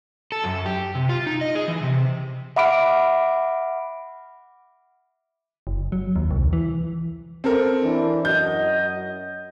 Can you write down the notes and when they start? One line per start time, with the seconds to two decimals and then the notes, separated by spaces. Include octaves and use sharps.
0.32 A4
0.44 F#2
0.66 G4
0.95 C3
1.09 F4
1.27 D#4
1.41 D#5
1.55 G#4
1.68 E3
1.83 C3
2.56 E5 F#5 B5 D6 F6 D7
5.67 F#1
5.92 F#3
6.16 D#2
6.31 C2
6.53 E3
7.44 C4 A4 A#4
7.83 E3 D4
8.25 F#2 F#4 D#5 G6